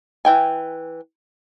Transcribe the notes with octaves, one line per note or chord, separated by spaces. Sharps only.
E3 G5 G#5